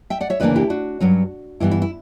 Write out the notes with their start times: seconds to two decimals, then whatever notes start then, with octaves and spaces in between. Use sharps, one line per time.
0.10 E5 G5
0.21 D5 F#5
0.30 C#5 E5
0.40 D2 C#3 E3 A#3 D4 B4 D5
0.56 E4 G4
0.70 D4 F#4
1.00 G2 F#3 C#4
1.60 G2 E3 B3 E4
1.71 E4
1.82 E4